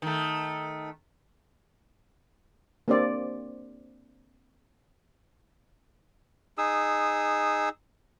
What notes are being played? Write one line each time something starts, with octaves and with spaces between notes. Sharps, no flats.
D#3 A3
A#3 C4 D4 G4 C5 D5
D#4 G#4 D#6 E6